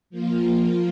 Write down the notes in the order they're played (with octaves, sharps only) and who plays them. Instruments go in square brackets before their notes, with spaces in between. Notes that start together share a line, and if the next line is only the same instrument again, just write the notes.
[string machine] F3 A#3 F4